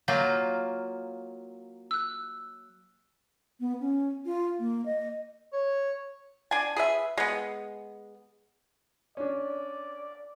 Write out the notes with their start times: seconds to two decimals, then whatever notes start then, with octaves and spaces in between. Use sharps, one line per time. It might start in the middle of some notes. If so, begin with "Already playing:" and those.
0.08 F#3 A#3 F4 G6
1.91 E6 F#6
3.60 B3
3.80 C#4
4.26 F4
4.59 A#3
4.86 D#5
5.53 C#5
6.51 D4 G#5
6.76 G#4 B4 E5
7.18 G#3 B3
9.17 C#4 D4 D5